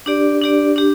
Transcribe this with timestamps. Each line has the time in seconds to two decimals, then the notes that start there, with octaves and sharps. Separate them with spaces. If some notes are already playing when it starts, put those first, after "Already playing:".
0.06 D4 G4 D5
0.41 D4 G4 D5
0.76 D4 G4